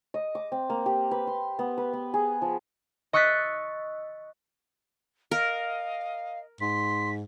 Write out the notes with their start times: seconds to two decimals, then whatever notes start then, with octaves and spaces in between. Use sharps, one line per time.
0.14 D#5
0.35 D6
0.52 C4
0.70 A#3
0.86 G4
1.11 B4
1.27 C6
1.59 B3
1.78 B4
1.93 B3
2.14 G#4
2.42 F3
3.13 D#5 C#6 E6 F#6 A6 B6
5.31 A#4 D#5 F5
6.61 G#2 C6 B6